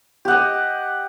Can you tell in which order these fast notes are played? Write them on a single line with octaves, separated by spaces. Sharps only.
G4 F#5 D#5